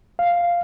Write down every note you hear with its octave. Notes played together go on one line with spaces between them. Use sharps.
F5